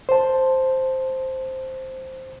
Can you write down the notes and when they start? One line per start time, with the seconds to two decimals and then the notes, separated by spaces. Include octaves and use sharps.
0.09 C5 A5